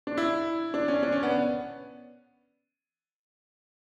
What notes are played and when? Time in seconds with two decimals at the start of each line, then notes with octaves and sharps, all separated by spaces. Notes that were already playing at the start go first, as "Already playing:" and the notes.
0.07 D4
0.17 E4
0.74 D4
0.88 C#4
1.03 D4
1.12 C#4
1.23 B3